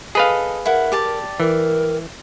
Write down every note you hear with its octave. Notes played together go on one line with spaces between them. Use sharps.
G#4 A4 B4 D#5 F5
E4 A#4 F#5
G4 D5 A5
E3 A#4